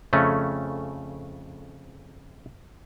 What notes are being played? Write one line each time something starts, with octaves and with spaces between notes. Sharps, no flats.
F2 C#3 A3 C#4